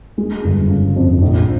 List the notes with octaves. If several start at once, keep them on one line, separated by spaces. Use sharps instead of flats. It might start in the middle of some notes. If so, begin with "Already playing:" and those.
G#3
G1
C#3
F2
A#1